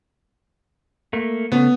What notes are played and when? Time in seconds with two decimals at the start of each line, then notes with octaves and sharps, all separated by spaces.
1.13 A3 A#3
1.52 C#3 A3 B3